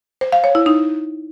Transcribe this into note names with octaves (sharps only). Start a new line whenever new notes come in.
C5
F5
C#5
E4
D#4